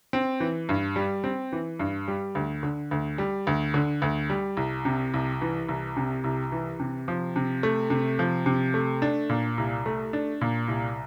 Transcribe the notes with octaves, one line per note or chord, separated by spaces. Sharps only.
C4
E3
G2
G3
C4
E3
G2
G3
D2
D3
D2
G3
D2
D3
D2
G3
C2
C3
C2
E3
C2
C3
C2
E3
C3
F3
C3
A3
C3
F3
C3
A3
D4
A#2
C2
A3
D4
A#2
C2